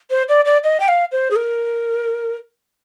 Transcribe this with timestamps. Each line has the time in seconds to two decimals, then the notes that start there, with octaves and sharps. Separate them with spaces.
0.10 C5
0.29 D5
0.45 D5
0.64 D#5
0.80 G5
0.88 F5
1.12 C5
1.31 G#4
1.36 A#4